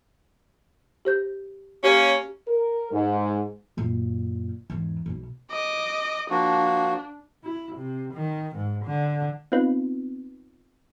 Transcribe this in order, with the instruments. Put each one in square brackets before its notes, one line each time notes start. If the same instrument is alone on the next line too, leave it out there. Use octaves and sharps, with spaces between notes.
[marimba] G4 C5 G6
[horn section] A#3 C#4 [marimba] G4
[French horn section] A#4
G#2
[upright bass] F#2 A#2
E2 G#2
B1 B2
[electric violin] D#5 D6
[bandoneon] F3 A#3 F#4 [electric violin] D4
[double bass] E4
C3
D#3
G#2
D3
[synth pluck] B3 C4 D#4 F4 B4